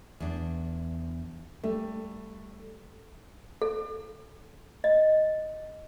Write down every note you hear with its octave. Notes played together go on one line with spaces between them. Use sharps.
E2 D4
G3 A3
A4
D#5